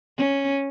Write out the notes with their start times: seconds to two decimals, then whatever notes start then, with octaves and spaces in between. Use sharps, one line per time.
0.17 C#4